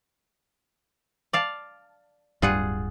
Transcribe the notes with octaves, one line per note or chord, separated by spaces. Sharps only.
D5 F5 A5
D1 G2 G3 F4 G#4 F#5